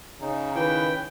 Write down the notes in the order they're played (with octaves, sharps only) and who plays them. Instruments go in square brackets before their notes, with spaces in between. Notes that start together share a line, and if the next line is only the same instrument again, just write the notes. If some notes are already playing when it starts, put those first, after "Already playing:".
[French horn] C#3 [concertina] D#4
[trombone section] D#3 B4 [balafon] E4 [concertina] G5